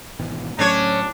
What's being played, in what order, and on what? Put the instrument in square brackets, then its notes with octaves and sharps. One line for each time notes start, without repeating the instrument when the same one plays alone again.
[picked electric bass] G#1 B2 E3
[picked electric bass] A2 F#3 A3 [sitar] C#4 C#5 [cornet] D4